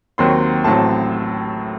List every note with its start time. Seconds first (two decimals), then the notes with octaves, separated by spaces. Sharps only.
0.18 D#2 D#3 F#3 C4 C6
0.64 A1 A2 F#3 C4 A5